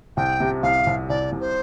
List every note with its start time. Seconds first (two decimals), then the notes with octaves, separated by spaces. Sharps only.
0.17 C2 G5
0.40 C3
0.63 C2 F5
0.87 C2
1.09 C2 D5
1.32 C2
1.40 C5